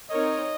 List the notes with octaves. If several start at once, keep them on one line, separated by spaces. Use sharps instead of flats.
C4 D#4 A#4 C#5 D#5